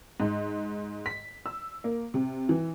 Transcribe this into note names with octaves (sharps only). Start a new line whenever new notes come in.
G#2
B6
E6
A#3
C3
E3